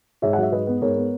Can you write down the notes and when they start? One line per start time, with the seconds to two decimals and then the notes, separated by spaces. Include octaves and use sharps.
0.22 G#2 C#5 E5
0.33 F#5
0.38 F#3 E5
0.52 G#2 B4 D#5
0.67 B3
0.82 G#2 A#4 C#5
0.97 B3